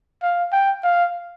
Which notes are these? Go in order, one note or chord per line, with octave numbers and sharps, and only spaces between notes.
F5
G5
F5